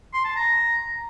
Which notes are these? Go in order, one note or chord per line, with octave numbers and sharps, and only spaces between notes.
C6
A5
A#5